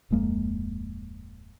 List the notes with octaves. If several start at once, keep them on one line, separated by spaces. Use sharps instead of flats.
D1 F2 G#3 A#3